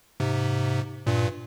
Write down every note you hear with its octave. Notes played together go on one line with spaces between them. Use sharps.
G#2 C3
G2 A#2